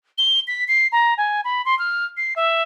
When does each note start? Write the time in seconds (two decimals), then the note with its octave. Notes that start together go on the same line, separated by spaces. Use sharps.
0.18 G7
0.48 B6
0.68 C7
0.92 A#5
1.18 G#5
1.44 B5
1.65 C6
1.79 F6
2.17 C7
2.36 E5